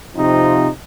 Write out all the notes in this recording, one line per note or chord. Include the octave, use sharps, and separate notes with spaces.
C3 F3 C4 D#4 F4